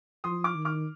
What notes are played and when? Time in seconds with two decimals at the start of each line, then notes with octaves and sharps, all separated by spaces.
0.24 F3 C6 D#6
0.44 D6 F6
0.55 D#3
0.65 D6 F6